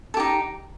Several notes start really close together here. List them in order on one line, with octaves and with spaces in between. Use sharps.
A4 G4 D#4